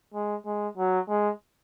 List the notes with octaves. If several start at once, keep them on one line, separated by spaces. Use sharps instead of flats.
G#3
G#3
F#3
G#3